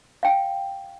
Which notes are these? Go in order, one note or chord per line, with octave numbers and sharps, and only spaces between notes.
F5 G5